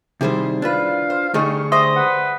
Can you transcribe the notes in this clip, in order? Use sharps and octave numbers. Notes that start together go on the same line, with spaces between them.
C3 D#3 G3 E4 G#4 C5
D4 F4 B4 F5
C5
D3 G3 A3 D#4 G#4 C#6
G3 C5 D#5 E5 C6 D#6
B4 F#5